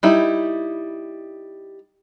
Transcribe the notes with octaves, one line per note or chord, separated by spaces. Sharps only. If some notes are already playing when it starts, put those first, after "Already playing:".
G3 D#4 E4